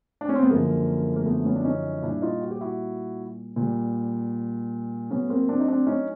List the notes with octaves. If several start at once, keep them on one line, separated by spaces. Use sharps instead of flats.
D4
C#4
C4
B3
F#2 D3 F3 G#3 A#3
A#3
A3 B3
B3 C#4
D4
C#4 D#4
A#2 G3 D4 E4
D#4 F4
F#4
G4
E4 F#4
A#2 G3
A2 F#3 B3 C#4
A#3 C4
C4 D4
D#4
C4 D4
C#4 D#4